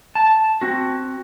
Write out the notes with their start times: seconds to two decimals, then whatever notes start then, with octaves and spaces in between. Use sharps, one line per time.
0.15 A5
0.61 C4 F#4